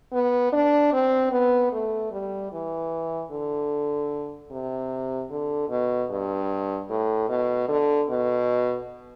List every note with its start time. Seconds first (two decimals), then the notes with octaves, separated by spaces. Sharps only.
0.12 B3
0.53 D4
0.93 C4
1.31 B3
1.72 A3
2.12 G3
2.52 E3
3.31 D3
4.51 C3
5.30 D3
5.69 B2
6.10 G2
6.90 A2
7.29 B2
7.68 D3
8.09 B2